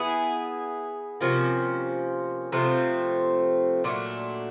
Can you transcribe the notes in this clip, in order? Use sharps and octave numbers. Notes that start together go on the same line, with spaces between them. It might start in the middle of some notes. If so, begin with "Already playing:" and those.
Already playing: B3 E4 G#4
C3 F3 A#3 C#4
C3 F3 A3 C4
A#2 F#3 A3 D4